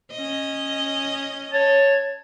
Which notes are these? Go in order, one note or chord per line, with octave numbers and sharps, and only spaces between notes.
C#4 D#5
C#5 A5